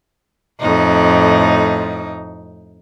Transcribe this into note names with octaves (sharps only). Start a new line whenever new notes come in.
F2 A2 D#4